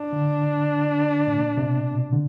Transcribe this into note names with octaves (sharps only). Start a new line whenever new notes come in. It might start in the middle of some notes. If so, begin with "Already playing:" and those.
Already playing: D4
D3
A2
A#2
C3
B2
D3